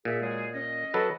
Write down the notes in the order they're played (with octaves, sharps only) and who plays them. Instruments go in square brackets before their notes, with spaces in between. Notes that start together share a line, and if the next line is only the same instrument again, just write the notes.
[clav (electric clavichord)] A#2 [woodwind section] G#4 E5
[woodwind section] F#3 G#3 G#4
C#4 D#5
[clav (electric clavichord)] F#3 A4 B4